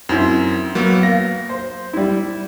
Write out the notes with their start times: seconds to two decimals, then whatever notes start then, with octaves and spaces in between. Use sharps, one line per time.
0.09 F#2 C4 E4
0.75 F#3 A#3 B3
1.03 F5 A#6
1.49 C5
1.93 G3 E4